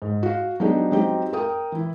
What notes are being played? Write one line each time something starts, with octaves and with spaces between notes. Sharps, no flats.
G#2
F#4 F5
F#3 B3 D4 D#4 G4 G#4
F#3 C4 D#4 G4
A#4 G5 D#6
E3 E4